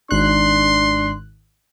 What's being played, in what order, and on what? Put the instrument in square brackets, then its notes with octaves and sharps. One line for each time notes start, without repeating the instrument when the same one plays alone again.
[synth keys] G#1 F#6 [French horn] D4 [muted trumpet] C6